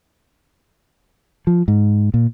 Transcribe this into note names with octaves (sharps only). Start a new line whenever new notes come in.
F3
G#2
A#2